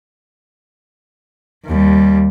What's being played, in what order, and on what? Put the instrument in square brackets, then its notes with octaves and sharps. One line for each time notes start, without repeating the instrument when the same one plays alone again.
[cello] D#2 G3